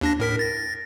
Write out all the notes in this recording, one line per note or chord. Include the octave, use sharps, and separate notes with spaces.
D#2 D4 A#6
A2 A#4 B6
A6 A#6